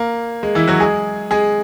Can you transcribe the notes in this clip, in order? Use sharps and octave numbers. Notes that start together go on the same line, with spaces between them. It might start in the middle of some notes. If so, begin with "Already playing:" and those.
Already playing: A#3
G#3
E3 E4
F#3 F#4
G#3 G#4
G#3 G#4